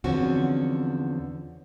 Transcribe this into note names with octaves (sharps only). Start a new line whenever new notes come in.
E2 D3 F3 C4 C#4 F#4